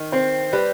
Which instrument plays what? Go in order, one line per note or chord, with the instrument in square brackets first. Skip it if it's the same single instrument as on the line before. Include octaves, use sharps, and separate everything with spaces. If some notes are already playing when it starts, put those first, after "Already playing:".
Already playing: [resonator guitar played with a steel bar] D#3
[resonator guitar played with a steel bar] C4 [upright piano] C5
[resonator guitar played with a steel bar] G3 [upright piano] B4